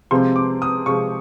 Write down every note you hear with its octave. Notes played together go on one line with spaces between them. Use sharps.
C3 F3 G#3 C4 C6
D6
D#6
C3 F3 G#3 C4 C#6